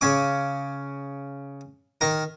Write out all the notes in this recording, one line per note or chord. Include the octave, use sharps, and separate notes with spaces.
C#3 C#4 D6
D#3 A#4